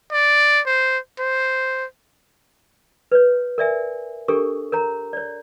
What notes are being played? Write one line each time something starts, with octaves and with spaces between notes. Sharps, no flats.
D5
C5
C5
B4 C#5
A#4 D5 E5 G#5
D4 G4 A4 A#4 C#6
A#4 C#5 A#5
C#5 D5